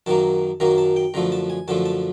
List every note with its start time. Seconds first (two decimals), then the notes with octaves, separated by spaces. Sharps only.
0.06 F#2 D#3 F#3 A#3 A5
0.60 F#2 D#3 F#3 A#3 A#5
0.78 A5
0.96 G5
1.14 F#2 D3 F3 A3 A#5
1.32 A5
1.50 G#5
1.68 F#2 D3 F3 A3 A5
1.85 A5